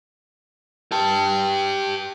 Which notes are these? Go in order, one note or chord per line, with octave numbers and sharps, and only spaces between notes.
G4 A5